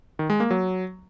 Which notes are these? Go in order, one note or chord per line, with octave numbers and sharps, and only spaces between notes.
D#3
G#3
A#3
F#3